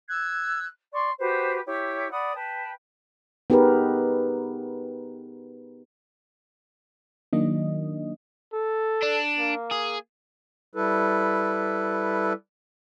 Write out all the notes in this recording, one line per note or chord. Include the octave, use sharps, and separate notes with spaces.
E6 F#6 G#6
D5 C6 C#6
F#4 G4 B4 C5
E4 G4 C#5
D5 F#5 B5 D#6
B4 G5 A5
B3 D#4 G4 G#4 A#4 B4
D#3 F#3 A#3 D4 D#5
A4
D4
A#3
G#4
G3 E4 A4 B4